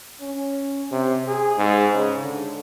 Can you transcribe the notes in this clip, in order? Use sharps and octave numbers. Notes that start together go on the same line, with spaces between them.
C#4
C3
G#4
G#2
C#3
D3